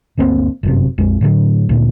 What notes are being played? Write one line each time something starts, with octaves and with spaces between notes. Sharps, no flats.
G1 D2 A#3 C4
G1 F#2 C3
A#1 F2 G#3
A2 D3 F3 F#3
D2 A#2